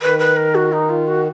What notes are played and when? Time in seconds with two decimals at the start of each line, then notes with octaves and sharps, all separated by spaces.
0.01 D#3 B4
0.19 B4
0.36 A#4
0.55 F#4
0.72 D#4
0.89 F4
1.07 F#4